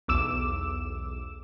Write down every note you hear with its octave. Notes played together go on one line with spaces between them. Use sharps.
B1 E2 D6 E6 E7